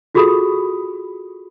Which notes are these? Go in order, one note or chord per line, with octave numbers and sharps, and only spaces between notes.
F4 F#4 G#4 A4 B5 D#6